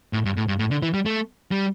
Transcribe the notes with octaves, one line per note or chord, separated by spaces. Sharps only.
A2
G2
A2
G2
A2
D3
E3
G3
A3
G3